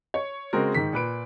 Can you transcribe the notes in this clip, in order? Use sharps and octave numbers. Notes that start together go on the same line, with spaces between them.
C#5
C#3 G#3 C4 F#4 A#4
G#2 D#3 B6
A#2 B4 D7